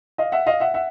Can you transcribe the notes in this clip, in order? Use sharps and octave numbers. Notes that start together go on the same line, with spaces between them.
D#5 F5
E5 F#5
D#5 F5
E5 F#5
E5 F#5